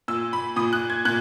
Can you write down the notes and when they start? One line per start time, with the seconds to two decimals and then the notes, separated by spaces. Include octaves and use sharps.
0.08 A#2 E6
0.33 B5
0.56 A#2 D#6
0.73 F#6
0.90 G#6
1.05 A#2 F#6